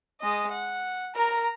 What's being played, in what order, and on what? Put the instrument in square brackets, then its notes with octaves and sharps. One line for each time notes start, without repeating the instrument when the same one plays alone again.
[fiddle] G#3 D#5
F#5
[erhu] A#4 [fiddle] A#5